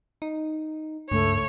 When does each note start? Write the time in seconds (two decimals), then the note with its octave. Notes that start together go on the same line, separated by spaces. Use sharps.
0.22 D#4
1.11 C#2 G2 A3 C#5